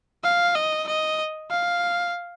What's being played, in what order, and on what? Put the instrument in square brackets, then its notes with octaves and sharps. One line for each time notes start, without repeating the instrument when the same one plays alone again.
[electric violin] F5
D#5
D#5
F5